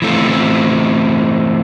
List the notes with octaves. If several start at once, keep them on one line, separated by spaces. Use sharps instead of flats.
E3 A3 C4 F4